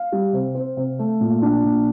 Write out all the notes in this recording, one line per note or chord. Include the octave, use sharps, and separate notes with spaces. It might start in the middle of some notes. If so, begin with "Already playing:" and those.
Already playing: F5
G3
C3
C4
C3
A3
A#2
D4
A#2